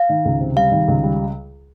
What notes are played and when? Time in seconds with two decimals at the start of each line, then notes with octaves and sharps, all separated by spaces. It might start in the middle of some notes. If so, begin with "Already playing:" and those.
Already playing: F5
0.09 D#3
0.25 C#2
0.40 C3
0.56 G3 F5
0.71 D#3
0.88 C#2
1.03 G3